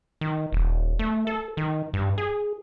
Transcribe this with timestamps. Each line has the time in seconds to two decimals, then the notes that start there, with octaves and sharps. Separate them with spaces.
0.21 D#3
0.52 D#1
0.99 A3
1.27 A4
1.57 D#3
1.93 G2
2.18 G#4